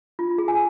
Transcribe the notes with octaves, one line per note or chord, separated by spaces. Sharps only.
F4
G#4
G#5